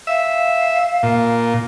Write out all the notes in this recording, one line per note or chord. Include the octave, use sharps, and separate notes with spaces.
E5 F5
A#2